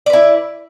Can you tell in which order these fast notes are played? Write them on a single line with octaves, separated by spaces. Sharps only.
D5 B4 E4